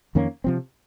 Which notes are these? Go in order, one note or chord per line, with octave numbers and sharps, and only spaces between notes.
F2 D#3 A#3 C#4
C3 F3 C4